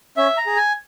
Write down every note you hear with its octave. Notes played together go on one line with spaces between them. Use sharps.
C#4 E5
A#5
G#4
G#5